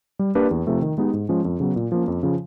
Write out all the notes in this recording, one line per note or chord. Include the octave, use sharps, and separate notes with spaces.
G3
A#3 D4 G4 B4
E2
C3 F3 A3
D#3
G#3 B3 D#4 G4
G#2
F3 G#3 C#4
F2
C#3 F#3 B3
A#2
F3 A#3 C#4
F2
C#3 F3